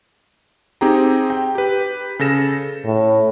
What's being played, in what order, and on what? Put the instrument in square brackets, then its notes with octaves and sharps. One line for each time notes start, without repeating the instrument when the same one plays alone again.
[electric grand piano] C4 D#4 G4 G#4 G5 A#5
G5
G4 B4
C#3 A4 A#6 E7
[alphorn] A2